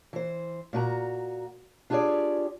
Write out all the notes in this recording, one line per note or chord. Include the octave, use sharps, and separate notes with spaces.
E3 C5
A#2 F#4 G#5 A#5
D4 F4 G4 G#4 C#5 D5